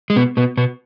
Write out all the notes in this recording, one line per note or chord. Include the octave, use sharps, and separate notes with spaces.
G#3
B2 B3
B2 B3
B2 B3